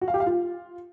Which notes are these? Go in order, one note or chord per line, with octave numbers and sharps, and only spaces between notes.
F#4
F5
G4
F5
F4